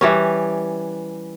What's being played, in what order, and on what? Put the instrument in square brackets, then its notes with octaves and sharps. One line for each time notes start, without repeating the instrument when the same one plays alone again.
[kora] E3 G3 C#4